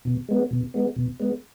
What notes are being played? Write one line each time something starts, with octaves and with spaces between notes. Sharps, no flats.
B2
G#3 B3
B2
G#3 B3
B2
G#3 B3